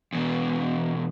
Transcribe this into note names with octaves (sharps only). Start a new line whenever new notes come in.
E2 B2